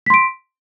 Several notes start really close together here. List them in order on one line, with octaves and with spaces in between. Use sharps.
B6 C6 D7